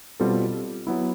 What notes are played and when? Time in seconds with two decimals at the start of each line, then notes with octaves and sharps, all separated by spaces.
0.20 B2 G3 C4 F4 A4
0.87 F#3 B3 E4